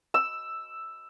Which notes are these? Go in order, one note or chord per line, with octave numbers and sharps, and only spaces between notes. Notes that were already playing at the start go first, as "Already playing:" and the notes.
E6